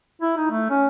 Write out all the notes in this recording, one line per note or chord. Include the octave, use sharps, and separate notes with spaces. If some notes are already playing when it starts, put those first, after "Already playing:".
E4
D#4
A3
C#4